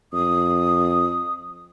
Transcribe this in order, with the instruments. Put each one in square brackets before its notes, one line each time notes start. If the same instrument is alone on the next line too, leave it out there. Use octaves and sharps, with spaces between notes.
[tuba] F2 [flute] D#6